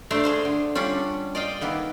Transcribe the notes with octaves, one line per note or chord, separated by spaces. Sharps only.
A3 D4 C5 D5 A5 A#5
G#4 C5 F5
D3
G3 C#4 D4 F4 F#5
D5 D#5 F5 G5
D#3 A#3 B3 E4